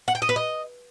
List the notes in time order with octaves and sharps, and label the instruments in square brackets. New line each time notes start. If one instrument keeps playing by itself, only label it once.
[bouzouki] F#5
G5
D#5
B4
D#5